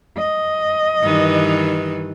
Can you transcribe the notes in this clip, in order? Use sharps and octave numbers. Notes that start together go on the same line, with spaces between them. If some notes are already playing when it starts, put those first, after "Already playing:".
D#5
G2 D#3 E3